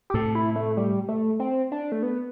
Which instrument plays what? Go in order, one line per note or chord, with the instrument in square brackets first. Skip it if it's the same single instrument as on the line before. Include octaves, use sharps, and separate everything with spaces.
[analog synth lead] G4
[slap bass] A2 C3 [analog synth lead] A4
[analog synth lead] E4
A3
G3
A3
C4
D4
A3
B3